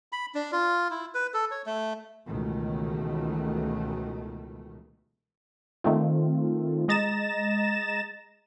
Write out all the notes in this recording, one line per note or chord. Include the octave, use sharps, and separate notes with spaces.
B5
D4
F4
E4
B4
A4
C#5
A3
C#2 B2 D#3 E3 A3
D#3 A3 C4 F4
G#3 D#5 A#5 A6 A#6 E7